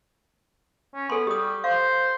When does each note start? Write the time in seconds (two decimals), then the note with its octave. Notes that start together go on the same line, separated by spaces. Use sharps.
0.94 C#4
1.10 B3 A4 C6
1.27 G3 G4 D#6
1.64 C5 F5